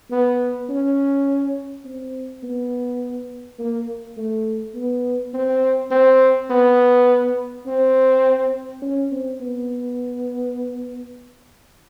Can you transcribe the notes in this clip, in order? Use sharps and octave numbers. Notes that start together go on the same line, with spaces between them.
B3
C#4
C4
B3
A#3
A3
B3
C4
C4
B3
C4
C#4
C4
B3